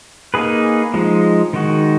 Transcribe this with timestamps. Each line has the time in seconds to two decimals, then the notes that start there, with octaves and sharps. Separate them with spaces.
0.34 A#3 D#4 G#4 B4
0.94 F3 G#3 D#4
1.53 D#3 G#3 D#4 F#4